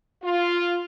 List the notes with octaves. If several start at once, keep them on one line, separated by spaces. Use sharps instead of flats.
F4